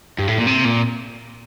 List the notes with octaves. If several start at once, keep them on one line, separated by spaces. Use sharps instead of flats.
G2
A2
A#2
C3
A#2